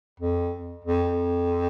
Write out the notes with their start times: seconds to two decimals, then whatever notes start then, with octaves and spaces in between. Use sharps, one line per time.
0.20 F2
0.85 F2